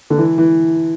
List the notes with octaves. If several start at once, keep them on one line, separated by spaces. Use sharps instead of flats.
D3
E3
E3